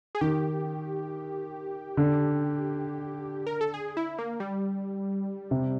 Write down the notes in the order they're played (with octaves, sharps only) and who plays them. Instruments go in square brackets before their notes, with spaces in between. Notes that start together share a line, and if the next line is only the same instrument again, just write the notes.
[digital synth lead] G#4
[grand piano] D#3 [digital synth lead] G4
[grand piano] D3
[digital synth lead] A#4
A4
G#4
E4
A#3
G3
[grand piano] C3